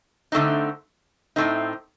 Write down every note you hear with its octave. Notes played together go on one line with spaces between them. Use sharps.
D3 A3 C4 D#4
A2 A3 C4 D#4